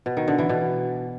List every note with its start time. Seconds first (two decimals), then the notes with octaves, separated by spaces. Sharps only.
0.06 B2
0.17 D#3
0.28 D3
0.38 E3
0.49 B2